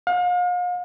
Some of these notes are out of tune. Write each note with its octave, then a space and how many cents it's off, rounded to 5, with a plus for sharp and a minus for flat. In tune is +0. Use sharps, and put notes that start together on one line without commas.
F5 +40